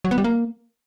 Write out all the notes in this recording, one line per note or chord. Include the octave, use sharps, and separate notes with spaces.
F#3
B3
G3
A#3